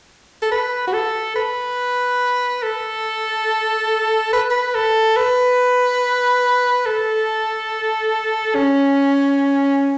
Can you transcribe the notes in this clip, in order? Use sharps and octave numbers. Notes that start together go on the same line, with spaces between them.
A4
B4
F#4
A4
B4
A4
B4
B4
A4
B4
A4
C#4